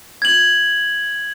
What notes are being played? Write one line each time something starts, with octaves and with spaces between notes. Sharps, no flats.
G#6 F#7